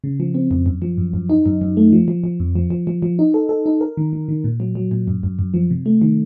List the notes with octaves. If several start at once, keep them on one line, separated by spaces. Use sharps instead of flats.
C#3
F3
C4
F2
F#2
F3
F#2
F#2
D#4
F#2
F#2
A3
F3
F3
F3
F2
F3
F3
F3
F3
D#4
A4
A4
D#4
A#4
D#3
D#3
D#3
A#2
F#3
F#3
A#2
F#2
F#2
F#2
F3
C3
A3
D#3